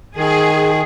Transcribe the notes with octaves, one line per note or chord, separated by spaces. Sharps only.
D#3 G#4